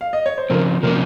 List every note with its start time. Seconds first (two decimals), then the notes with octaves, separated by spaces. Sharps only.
0.01 F5
0.13 D#5
0.26 C#5
0.38 C5
0.50 C#3 F3 C4 A#4
0.83 C3 F3 A#3 C#4 A#4